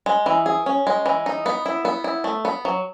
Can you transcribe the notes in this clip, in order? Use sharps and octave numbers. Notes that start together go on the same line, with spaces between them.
G#3
E3
G#4
C#4
G#3
E3
D#4
B3
E4
B3
E4
A3
B3
F#3